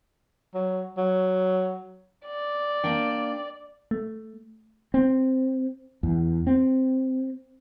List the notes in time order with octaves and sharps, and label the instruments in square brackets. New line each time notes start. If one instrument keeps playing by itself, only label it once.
[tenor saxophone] F#3
F#3
[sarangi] D5
[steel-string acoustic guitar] A#3 D4 G5
[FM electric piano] A3
[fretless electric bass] C4
E2
C4